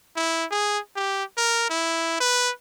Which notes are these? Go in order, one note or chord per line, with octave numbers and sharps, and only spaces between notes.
E4
G#4
G4
A#4
E4
B4